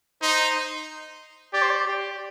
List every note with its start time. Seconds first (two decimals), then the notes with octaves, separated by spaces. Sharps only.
0.22 D#4 C5
1.53 G4 D5
1.62 C5
1.70 D5
1.87 G4